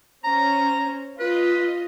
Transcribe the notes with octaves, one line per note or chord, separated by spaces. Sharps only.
C#4 C5 A#5
F4 B4 D#5